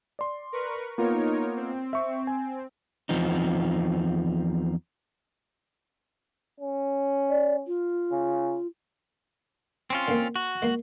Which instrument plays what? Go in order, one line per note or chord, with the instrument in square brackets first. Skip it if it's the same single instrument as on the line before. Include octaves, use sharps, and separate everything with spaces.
[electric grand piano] D5 C6
[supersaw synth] A#4 B4 C#6
[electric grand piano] A#3 B3 F4 [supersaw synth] D#4 A#4 C#5
[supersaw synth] C4
[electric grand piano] E5 C#6
G#5
[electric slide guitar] E2 F3 C4 D#4
[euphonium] C#4
[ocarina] D5
F4
[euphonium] C#3
[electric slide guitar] C4 C#4 F4
[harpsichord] D3 A#3
[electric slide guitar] F#4
[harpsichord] G#3 A#3